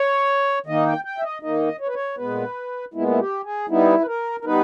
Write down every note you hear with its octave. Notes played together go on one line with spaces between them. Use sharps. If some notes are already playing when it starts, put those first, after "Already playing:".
Already playing: C#5
D#3 A#3 D#4 D#5
G5
G5
E5
D#5
D#3 A#3 D#4 D#5
C#5
B4
C#5
A#2 G#3 B3 B4
A#2 G#3 B3 E4
E4
G4
G#4
G3 B3 D#4 E4
B4
A#4
A#4
G3 B3 D#4 B4